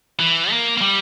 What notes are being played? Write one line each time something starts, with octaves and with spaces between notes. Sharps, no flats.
E3
A#3
A#3
G3